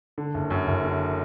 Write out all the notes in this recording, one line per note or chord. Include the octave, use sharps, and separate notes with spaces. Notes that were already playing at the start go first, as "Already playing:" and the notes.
D3
F#1
F#2
F#1
D3